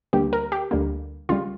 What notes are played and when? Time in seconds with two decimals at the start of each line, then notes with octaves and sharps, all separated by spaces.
0.13 D2 D3 G3 A#3 G4
0.33 A#4
0.52 G4
0.71 D2 D3 G3 A#3
1.29 C#2 C#3 G3 F4